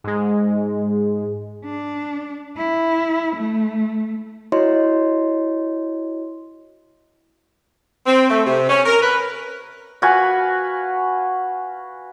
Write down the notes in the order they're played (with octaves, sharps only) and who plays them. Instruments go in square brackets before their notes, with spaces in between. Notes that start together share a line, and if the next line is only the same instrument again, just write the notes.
[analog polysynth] G#2 G#3
[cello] D4
E4
A3
[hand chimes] E4 F#4 C#5 D#5 C6
[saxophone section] C4
A3
C3
C#4
A#4
B4
[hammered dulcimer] F#4 B4 F5 G#5